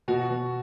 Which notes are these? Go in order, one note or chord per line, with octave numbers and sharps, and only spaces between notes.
B2 F#4
B2